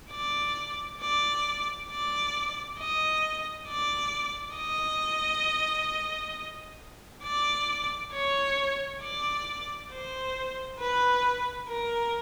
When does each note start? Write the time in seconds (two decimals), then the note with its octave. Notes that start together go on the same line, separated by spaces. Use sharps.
0.11 D5
1.01 D5
1.90 D5
2.79 D#5
3.68 D5
4.56 D#5
7.24 D5
8.13 C#5
9.03 D5
9.91 C5
10.80 B4
11.69 A#4